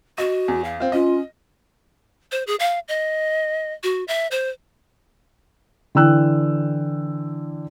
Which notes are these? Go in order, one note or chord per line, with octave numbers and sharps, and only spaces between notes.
F#4 D#5
E2
F5
C4 F4
C#4 F4 D#5
C5
G#4
F5
D#5
F#4
E5
C5
D3 E3 G5 E6 F#6